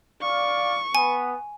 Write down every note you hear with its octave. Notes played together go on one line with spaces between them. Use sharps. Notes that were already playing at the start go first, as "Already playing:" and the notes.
D5 F5 C#6
B3 G#5